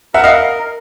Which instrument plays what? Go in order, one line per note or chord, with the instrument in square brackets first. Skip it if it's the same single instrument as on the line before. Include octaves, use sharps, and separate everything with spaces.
[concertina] A#4 [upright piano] E5 F#5
[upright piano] D#5 F5